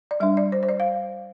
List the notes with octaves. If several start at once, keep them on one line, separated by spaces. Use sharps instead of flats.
D5
G3 D4 E5
D5
C5
C5
D5
F5